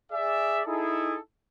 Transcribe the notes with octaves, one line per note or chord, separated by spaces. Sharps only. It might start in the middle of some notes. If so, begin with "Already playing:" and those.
G#4 D5 E5
D#4 E4 G#4 A4